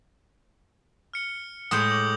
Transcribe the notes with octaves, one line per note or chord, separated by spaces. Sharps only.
F6 C#7 G7
A2 G#3 C#5 D#6 G6
D6 F#7